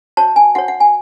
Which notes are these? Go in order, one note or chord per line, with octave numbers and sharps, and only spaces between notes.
F#4 C#5 A5
G#5
F#4 C#5 F#5
F#5
G#5